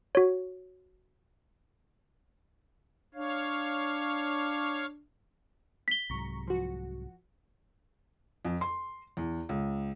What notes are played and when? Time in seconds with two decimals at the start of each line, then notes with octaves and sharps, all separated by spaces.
0.15 F#4 C#5
3.15 D4 C#5 F5
5.88 B6 G7
6.10 C2 G#2 F#3 A#5 C#6
6.47 F3 F#4
8.45 F2
8.61 C6
9.17 E2
9.49 C#2